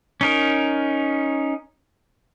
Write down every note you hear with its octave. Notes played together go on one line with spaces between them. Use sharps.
C#4 D#4 A#4